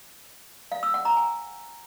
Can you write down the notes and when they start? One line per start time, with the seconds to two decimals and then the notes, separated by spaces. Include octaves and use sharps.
0.72 F5
0.83 E6
0.94 F#5
1.05 A#5
1.17 G#5